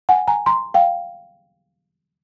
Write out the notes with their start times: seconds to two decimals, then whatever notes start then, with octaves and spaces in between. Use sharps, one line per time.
0.09 F#5 G#5
0.28 G#5 A#5
0.46 A#5 C6
0.74 F5 G5